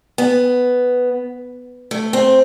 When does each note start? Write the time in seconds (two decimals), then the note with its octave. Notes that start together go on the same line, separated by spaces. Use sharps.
0.18 B3
1.91 A3
2.13 C4